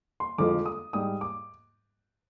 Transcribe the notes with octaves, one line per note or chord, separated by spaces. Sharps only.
C6
F2 D3 F3 G#3 D6
D#6
G#2 G3 D#6
D6